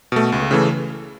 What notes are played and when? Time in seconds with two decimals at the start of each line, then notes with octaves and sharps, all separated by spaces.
0.12 B2 A3
0.32 C#2
0.51 C#3 E3 A3